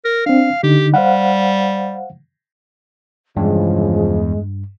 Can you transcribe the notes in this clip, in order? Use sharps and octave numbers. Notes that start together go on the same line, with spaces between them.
A#4
C4 D4 F5
D3 D#4 G4
G3 C5 F5 F#5
E2 G2 C#3 F3 G#3